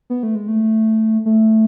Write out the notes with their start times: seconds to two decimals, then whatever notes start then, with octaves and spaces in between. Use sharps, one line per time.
0.10 B3
0.23 A3
0.35 G#3
0.48 A3
1.26 A3